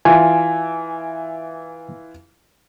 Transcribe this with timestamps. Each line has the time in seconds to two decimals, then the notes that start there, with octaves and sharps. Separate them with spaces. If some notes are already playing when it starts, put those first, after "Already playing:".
0.05 E3 F4 G#5